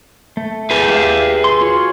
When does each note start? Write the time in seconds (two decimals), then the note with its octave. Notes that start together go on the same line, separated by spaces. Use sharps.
0.37 A3
0.71 G#4 B4
0.89 G4 E5 F5
1.44 C6
1.61 F4 F#4 C#5